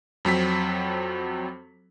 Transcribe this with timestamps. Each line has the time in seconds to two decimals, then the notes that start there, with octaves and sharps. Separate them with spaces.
0.25 F2 F#3 C4 B6